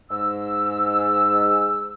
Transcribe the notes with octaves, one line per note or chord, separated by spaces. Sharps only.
G#2 E6